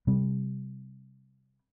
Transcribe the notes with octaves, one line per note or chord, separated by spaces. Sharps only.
C3 G3